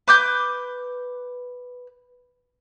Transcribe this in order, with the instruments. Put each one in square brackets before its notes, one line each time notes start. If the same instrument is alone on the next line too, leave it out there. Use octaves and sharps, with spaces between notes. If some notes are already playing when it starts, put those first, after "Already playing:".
[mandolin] B4 D6 G6